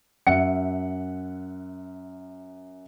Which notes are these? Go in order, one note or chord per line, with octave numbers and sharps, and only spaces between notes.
F#2 E5 F#5 C#7